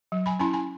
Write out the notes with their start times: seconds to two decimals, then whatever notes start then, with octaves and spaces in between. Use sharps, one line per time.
0.12 F#3
0.26 G#5 B5
0.39 C#4 E4 G#5 B5
0.53 G#5 B5